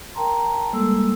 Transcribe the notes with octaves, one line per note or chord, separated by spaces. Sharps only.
A#4 G5 A5 A#5 C6
G3 G#3 A#3 A4 E6